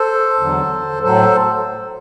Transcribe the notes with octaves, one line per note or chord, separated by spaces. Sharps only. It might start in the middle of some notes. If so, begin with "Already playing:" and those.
Already playing: A4 C5
E2 D3 F#3
A2 F#3 A4 C5